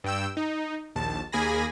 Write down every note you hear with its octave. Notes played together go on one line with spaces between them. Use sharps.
G2 G5 E6
D#4
A#1 D#2 A5
D#2 A#3 G#4 G#5 B5 A#6